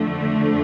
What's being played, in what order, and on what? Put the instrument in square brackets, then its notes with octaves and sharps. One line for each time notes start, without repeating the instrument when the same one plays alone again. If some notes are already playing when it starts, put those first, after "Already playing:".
Already playing: [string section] F2 D3 A3